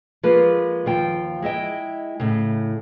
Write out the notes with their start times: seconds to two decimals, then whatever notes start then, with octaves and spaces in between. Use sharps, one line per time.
0.23 F3 G#3 A#3 B4
0.86 D#2 F3 G5
1.42 G#3 E4 D#5 G5
2.20 A2 C#3